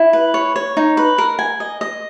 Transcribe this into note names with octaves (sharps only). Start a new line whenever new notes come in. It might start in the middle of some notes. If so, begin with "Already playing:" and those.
Already playing: E4
B4
C#5
C#5
D#4
B4
A#4
G#5
D#5
D#5